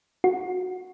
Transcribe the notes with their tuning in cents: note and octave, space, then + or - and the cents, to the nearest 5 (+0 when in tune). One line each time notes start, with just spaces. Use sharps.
F#4 -15